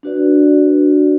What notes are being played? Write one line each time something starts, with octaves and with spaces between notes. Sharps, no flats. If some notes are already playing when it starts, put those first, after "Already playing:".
D4 F#4 B4 D5